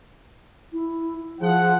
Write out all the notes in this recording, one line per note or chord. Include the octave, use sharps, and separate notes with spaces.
E4
F3 G#4 F#5